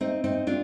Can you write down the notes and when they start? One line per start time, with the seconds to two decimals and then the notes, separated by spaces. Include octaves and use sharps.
0.01 C4 D#4
0.24 C4 D#4
0.47 D4 F4